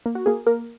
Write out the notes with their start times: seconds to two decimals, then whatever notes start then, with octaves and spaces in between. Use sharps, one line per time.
0.06 A#3
0.15 F#4
0.26 A#3 G#4
0.46 A#3 A#4